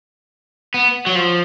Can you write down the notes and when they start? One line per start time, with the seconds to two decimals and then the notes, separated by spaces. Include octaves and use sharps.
0.74 B3
1.07 F#3
1.15 F3